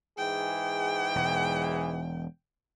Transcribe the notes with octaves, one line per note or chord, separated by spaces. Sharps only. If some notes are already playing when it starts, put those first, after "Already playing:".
G#2 E3 G#4 G5
E1